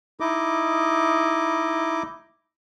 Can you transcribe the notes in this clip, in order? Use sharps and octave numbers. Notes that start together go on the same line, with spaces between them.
D#4 E4 D#5 D6